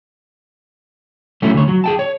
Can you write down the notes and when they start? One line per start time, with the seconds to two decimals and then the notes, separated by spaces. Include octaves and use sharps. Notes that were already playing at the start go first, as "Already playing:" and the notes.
1.42 F#3 A3 C#4 E4
1.54 D2 C#5
1.68 F#3
1.84 G#4 G5 A5
1.99 C#5